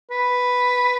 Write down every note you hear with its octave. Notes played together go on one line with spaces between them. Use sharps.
B4